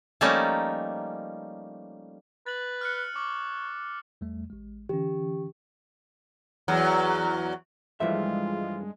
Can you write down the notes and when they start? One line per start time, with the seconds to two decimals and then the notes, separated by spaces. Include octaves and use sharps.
0.21 F3 G3 A3 A#3 C#4 D#4
2.47 B4 A6 F#7
2.81 F6 F#6 C#7
3.16 C#5 D6
4.21 E2 G3 A3
4.50 A1 G#3
4.89 D3 E3 C#4 G4
6.68 E2 F#3
8.00 G2 E3 F3 G#3 A3 F4 E5